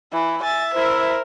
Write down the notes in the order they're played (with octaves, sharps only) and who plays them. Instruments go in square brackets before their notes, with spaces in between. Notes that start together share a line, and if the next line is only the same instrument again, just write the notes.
[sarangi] E3 [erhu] E4
[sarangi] E5 [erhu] G#5 [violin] A6
[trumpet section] E4 [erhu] A#4 [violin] C5